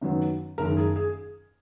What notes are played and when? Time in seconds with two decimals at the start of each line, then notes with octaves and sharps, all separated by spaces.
0.01 F#2 D#3 F#3 B3
0.58 F#1 F#2 D#3 G#3 A#4
0.77 G#4
0.96 G#4